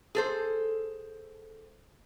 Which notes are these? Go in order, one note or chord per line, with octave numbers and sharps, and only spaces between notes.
G#4 A4 C5